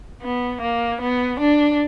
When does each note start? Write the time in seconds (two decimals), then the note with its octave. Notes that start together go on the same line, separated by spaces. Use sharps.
0.22 B3
0.61 A#3
1.01 B3
1.40 D4